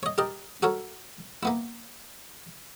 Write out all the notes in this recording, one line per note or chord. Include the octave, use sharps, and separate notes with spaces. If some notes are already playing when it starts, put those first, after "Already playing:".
C#5 D#5
G4 A#4 D#5 A5
F#4 A4 A#4 C#5
A#3 B3 E4